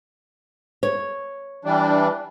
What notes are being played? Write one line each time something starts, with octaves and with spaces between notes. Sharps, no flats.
C#5
E3 G3 D4